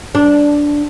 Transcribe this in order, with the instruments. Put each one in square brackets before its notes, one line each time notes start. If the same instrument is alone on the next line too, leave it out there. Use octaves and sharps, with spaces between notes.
[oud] D4